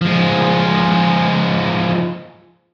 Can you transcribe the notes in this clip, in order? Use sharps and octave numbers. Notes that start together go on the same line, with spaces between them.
F3 G#3